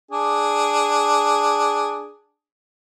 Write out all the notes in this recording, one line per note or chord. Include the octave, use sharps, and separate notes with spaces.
D4 G#4